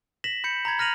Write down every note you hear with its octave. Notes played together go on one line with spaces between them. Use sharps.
A#6 B6 E7 F#7
B5 G6 C#7
A#5 B5 G#6
A#5 F6 A#6 D#7 F7 F#7